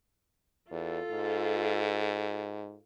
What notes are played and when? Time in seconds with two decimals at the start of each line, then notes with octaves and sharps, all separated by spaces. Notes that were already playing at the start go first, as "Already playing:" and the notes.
0.71 E2 F4 A4
1.11 G#2